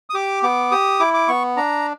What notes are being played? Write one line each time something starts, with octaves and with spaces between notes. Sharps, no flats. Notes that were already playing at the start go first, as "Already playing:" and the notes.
D#6
G4 D6
B3 D6
G4 D#6
E4 D6
D6
B3 C#6
D4 A#5